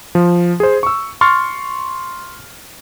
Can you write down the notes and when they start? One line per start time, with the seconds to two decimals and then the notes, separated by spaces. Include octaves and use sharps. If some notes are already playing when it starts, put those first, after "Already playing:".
0.15 F3
0.60 G#4 C5
0.83 C#6 E6
1.21 C6 C#6 F6 A6